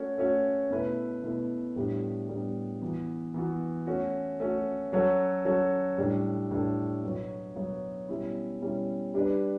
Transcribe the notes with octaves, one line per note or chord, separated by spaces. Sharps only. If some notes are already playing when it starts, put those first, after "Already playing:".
Already playing: A3 C#4 F#4 C#5
A3 C#4 F#4 C#5
B2 A3 E4 B4
B2 A3 E4 B4
A2 G3 B3 D4 G4
A2 G3 B3 D4 G4
E3 B3 F#4
E3 B3 F#4
A3 C#4 F#4
A3 C#4 F#4
F#3 C#4 F#4 A4 C#5
F#3 C#4 F#4 A4 C#5
A2 G3 D4 A4
A2 G3 D4 A4
B2 F#3 B3 F#4 C#5
B2 F#3 B3 F#4 C#5
B2 G3 C#4 E4
B2 G3 C#4 E4
G3 D4 G4 B4 D5